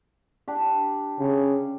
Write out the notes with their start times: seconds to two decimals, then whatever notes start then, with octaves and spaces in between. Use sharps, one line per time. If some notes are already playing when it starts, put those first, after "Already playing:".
0.48 D4 G4
1.19 C#3